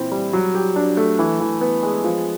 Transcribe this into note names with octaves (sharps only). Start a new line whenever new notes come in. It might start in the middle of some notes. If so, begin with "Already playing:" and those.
Already playing: A#2 E3 C4 E4
G3
F#3
G4
D4
A3
E3
E3
B3
G#3
F3